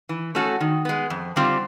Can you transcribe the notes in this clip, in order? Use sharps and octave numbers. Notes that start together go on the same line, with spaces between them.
E3
A3 C#4 F#4 A4
D#3
G#3 B3
F2
D3 G3 C4 F4